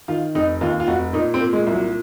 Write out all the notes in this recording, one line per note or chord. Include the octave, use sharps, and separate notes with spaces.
D#3 F4
F1 D#4
D#2 F4
F4
F1 F#4
A#2 D#4
C4
A#2
G#3
C2
F#3